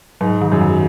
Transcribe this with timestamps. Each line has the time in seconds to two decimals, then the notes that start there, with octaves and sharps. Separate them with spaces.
0.21 G#2 F#3
0.41 D#3
0.52 F#2
0.61 D#3